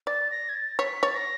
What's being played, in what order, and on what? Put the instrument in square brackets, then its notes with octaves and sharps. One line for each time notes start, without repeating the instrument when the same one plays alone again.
[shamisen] D5 [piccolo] A6
[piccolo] A#6
G#6
A6
[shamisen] C#5 [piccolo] B6
[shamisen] C#5 [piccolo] A6
[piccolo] A#6